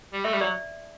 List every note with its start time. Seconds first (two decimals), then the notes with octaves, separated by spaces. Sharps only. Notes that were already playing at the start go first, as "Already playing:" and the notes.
0.13 G3
0.24 A3 E5
0.33 G3
0.41 F#3 D5